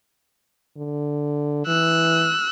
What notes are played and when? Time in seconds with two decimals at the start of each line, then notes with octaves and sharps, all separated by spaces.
0.77 D3
1.67 E3 E6 F#6